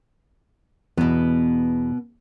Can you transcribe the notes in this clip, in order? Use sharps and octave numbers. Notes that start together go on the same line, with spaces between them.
E2 B2 B3